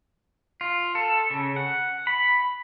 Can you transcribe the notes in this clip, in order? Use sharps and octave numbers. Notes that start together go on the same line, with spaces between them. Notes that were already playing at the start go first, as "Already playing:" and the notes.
F4
A4
C#3
F#5
B5